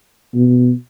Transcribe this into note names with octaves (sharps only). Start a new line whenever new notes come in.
B2